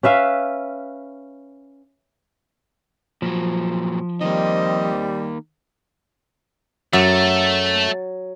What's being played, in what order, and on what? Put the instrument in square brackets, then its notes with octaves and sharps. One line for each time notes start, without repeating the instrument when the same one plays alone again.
[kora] C#4 B4 E5 F5
[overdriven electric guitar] A#2 F#3 [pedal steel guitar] F3
[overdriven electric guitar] D#3 A#3 [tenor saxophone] G3 [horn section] C4 D#5
[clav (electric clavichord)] F#2 E5 [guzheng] F#3 [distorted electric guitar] A3